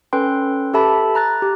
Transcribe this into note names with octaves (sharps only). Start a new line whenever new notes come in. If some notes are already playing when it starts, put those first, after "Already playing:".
C#4 A4 B4 G5 C6
G4 A4 E5 A5 B5
A#5 F#6 A6
G4